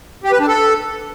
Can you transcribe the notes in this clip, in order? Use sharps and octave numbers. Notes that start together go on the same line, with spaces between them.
G4
B4
D4
A4